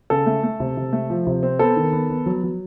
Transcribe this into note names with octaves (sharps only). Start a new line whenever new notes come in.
C#3 A4
A3
A3
C3
C3
A3
F3
C3
C4
B3 A4
D#3
B3
B3
F#3
F#3